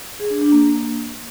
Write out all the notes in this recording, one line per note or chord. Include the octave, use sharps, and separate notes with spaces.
G#4
D4
D4
A#3